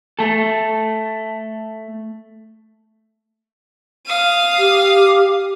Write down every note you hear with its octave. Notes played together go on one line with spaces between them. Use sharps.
A3 A4
F5 D#6
G4